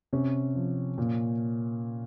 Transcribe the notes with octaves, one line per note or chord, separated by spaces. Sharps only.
C3 C#4
F3
A#2